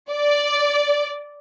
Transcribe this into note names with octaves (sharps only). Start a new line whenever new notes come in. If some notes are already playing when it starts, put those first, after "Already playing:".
D5